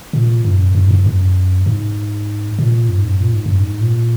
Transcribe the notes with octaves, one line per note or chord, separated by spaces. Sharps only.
A#2
F#2
F#2
G#2
F#2
F#2
G#2
A#2
F#2
G#2
F#2
A#2
G#2
F#2
G#2
A#2